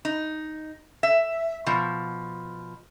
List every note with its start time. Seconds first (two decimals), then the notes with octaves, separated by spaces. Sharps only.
0.05 D#4
1.03 E5
1.66 B2 F3